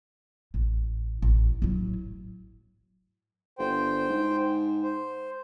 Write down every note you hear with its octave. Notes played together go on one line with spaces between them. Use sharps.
A1
A1
A2 F#3
G1 C5 G5
G#2
C5